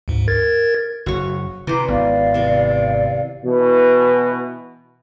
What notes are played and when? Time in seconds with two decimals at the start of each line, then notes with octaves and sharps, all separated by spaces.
0.08 D2 G#2
0.28 A#4 G#6 A6
1.06 F#1 F#4 C#5
1.67 C3 E3 C5 A#5 D6
1.88 G#1 B3 D5 F5
2.34 C3 E3
3.44 B2 E3